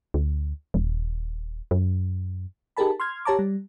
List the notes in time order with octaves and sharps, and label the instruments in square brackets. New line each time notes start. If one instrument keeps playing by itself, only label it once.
[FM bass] D2
D#1
F#2
[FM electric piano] D#4 G4 G#4 A#4 A5 B5
C6 F6 G#6
G4 C#5 A5 A#5 D6
G3